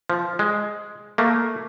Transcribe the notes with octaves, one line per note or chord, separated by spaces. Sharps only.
F3
G#3
A3 A#3